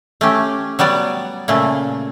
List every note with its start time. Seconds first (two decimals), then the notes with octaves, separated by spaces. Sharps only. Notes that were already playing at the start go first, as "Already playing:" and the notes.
0.21 A3 C#4 G4
0.79 F#3 G3 B3 D5
1.48 A#2 C#3 A3